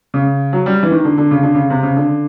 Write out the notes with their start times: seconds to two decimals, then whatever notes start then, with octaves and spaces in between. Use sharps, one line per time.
0.14 C#3
0.53 F#3
0.66 G3
0.83 E3
0.92 D#3
1.05 D3
1.18 D3
1.31 C#3
1.43 D3
1.55 C#3
1.70 C3
1.83 C#3
1.96 D3